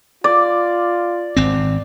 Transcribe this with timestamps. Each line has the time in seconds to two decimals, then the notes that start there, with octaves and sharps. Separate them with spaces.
0.24 F4 D5 D6
1.36 G#1 C4